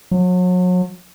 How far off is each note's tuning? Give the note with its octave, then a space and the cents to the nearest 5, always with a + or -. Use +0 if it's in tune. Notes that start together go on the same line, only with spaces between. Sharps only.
F#3 -35